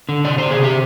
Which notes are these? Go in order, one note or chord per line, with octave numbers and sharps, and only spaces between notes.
D3
C3 D5
C3 C5
G#4
C3 G4